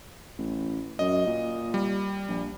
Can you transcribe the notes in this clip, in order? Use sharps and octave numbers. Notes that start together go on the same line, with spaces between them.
A1
F#2 D#5
A#2
G3
A#1